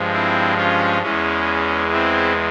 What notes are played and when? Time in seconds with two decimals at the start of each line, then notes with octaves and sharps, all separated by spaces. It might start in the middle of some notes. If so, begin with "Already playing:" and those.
Already playing: G2 F3 G#3
0.13 C4 E4
0.58 C#4 F4
1.02 E2 E3 G#3 C#4
1.92 C4 E4